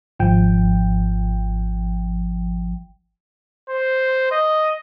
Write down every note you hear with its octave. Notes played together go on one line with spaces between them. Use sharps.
G#1 F3 G5
C5
D#5